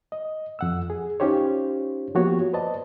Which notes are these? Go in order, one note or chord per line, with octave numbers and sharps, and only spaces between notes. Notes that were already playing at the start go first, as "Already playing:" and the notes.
D#5
F2 F#5 E6
G#4
C#4 D#4 F4 G4 C5 C#5
F3 A#3 B3 F#4 G4 C#5
B4 C5 D5 D#5 A5